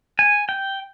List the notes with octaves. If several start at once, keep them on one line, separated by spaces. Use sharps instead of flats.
G#5
G5